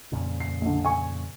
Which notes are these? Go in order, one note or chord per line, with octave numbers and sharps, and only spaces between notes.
F2 A#2 C#3
C7
A#1 D3
G#5 C#6